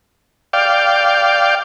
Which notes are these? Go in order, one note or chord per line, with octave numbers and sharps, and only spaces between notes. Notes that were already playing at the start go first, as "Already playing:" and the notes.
D5 F5 G5